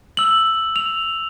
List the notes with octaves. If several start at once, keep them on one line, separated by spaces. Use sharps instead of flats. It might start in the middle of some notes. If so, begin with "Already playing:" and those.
E6 F#7
F7